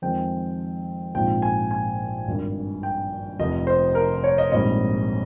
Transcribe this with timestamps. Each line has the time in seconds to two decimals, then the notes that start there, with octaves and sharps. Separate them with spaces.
0.02 F2 D#3 G#3 C4 G5
1.14 A#1 G#2 F3 C4 G5
1.42 G#5
1.71 G#5
2.28 G#1 G2 D#3
2.83 G5
3.39 F1 F2 C3 D#5
3.67 C5
3.95 A#4
4.24 C#5
4.38 D#5
4.52 A#1 G#2 G3 C4 D#5